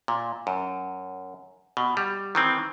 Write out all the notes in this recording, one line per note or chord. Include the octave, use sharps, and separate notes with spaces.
A#2
F#2
B2
G3
D#3 E3 C4